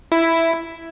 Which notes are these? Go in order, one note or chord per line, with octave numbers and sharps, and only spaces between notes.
E4